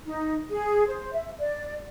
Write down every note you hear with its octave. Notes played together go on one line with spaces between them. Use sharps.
D#4
G#4
C5
E5
D5